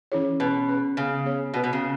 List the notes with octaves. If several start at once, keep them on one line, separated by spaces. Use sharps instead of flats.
E3 C#4 E4 G#4 C#5
B2 C#4 G#4 B4
C#4 G#4 B4
C#3 B3 G#4 C#5
B3 G#4 C#5
B2 B3 F#4 B4
B2
C#3